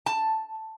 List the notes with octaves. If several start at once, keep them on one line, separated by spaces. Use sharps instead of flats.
A5